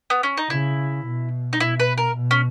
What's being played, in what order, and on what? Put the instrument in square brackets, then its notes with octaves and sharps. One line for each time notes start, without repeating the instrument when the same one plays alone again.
[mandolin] B3
C#4
D#4
[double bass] C#3 [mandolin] E4
[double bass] B2
[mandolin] D#4
[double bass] B2 [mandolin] E4
[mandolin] B4
A#4
[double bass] B2
[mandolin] C#4